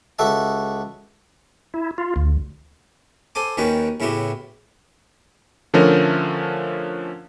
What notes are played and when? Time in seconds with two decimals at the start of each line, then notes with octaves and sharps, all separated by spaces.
0.19 C#2 F#4 A4 E5 A5
1.74 E4
1.98 F4
2.16 D2
3.35 A4 C5 G#5 D6
3.57 D#2 D#3 C#4 F#4 B4 G5
4.00 A2 C#3 B3 E4 F#4 G4
5.74 D3 F3 A3 C#4 A#4